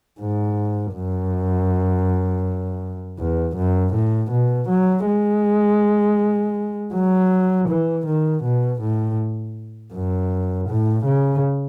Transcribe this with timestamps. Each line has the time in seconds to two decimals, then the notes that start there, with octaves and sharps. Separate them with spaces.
0.20 G#2
0.94 F#2
3.18 E2
3.57 F#2
3.94 A2
4.31 B2
4.69 F#3
5.06 G#3
6.94 F#3
7.69 E3
8.07 D#3
8.44 B2
8.81 A2
9.94 F#2
10.69 A2
11.05 C#3